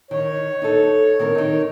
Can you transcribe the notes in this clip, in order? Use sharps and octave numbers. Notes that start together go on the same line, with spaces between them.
D#3 C#5
D#4 A4
D#3 C4 A#4
D#3 D#4